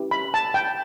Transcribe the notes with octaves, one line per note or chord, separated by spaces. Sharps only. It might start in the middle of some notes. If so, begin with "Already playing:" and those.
Already playing: C#4 E4 G4 B4
B5
A5
G5